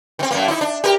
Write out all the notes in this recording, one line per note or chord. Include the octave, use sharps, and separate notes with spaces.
D#3 C4
F#2 A2 A#3
D#4 E4
D4
G4 A#4